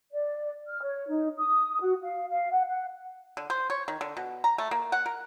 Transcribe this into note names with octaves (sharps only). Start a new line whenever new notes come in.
D5
F6
C#5
D#4
D#6
F#4
F5
F5
F#5
F#5
D3
C5
C#5
D#3
D3
B2
A#5
A3
A#3
F#5
A#4